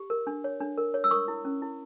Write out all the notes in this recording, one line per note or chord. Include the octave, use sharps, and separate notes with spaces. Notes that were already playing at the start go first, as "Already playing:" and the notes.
Already playing: G4
A#4
D4
C#5
D4
A#4
C#5
E6
A#4 C#6 D#6
E4
C#4
E4